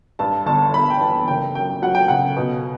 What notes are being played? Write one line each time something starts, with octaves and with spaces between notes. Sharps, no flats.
G2 A5
G1 A5
G1 B5
G5
E3 A5
F#1 G5
F#2 G5
F#3 F#5
G5
C#3 F#5
B2